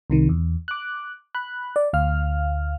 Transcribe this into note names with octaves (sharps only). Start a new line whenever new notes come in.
C2 C3 D#3
E2
D6 F#6
B5 F#6
D5
D2 F5 F6